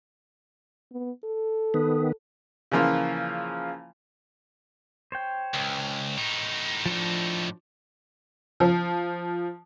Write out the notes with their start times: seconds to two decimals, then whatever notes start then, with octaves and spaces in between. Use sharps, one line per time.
0.92 B3
1.24 A4
1.74 D#3 B3
2.72 C#3 E3 F3 A#3 F4
5.12 C5 C#5 G5
5.54 C#2
6.17 A2 D#4
6.86 F3 D4
8.60 F3